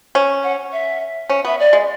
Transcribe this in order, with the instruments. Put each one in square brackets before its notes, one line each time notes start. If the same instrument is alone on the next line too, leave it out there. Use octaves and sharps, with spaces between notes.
[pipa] C#4
[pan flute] F#5
E5
[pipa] C#4
[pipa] B3 [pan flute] E5
[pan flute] D5
[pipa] G#3